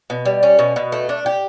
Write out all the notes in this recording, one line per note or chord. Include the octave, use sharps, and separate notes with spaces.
B2
G3
C#4
B2
B2
A3
D4
G4